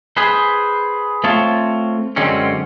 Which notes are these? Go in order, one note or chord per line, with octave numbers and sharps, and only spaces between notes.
G#4 B4 C5
A3 C4 F4 C#5 A5
F#2 D3 G#3 C4 C#4